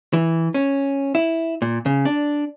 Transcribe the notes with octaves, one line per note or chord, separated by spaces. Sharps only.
E3
C#4
E4
A#2
C#3
D4